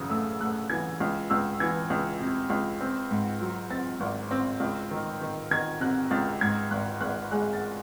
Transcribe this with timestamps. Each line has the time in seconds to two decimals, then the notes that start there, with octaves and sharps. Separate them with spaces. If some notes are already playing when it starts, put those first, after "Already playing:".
Already playing: F#2 C#3 E3 D#6
0.10 A3 E6
0.40 A3 F#6
0.70 E3 G#6
1.00 C#2
1.30 C#2 E6
1.60 E3 G#6
1.90 C#2
2.20 C3
2.50 C#2
2.81 C4
3.11 G#2
3.41 F#3
3.70 C4 A6
4.00 G#1
4.31 C4
4.60 C#2
4.91 D#3
5.21 D#3
5.51 D#3 G#6
5.80 C3 F#6
6.11 C#2 A6
6.41 G#2 G#6
6.71 G#1 F#6
7.01 G#1 F#6
7.31 G#3 F#6
7.53 A6